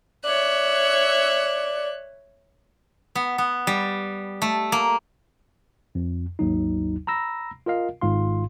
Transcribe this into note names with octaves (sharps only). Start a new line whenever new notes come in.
C#5 D5 E5 F#6
B3
B3
G3
A3
A#3
F2
G#1 D#2 F#3 D#4
A#5 B5 E6 A#6
F4 A#4 D#5 F5
G#1 G#2 F4 F5 C6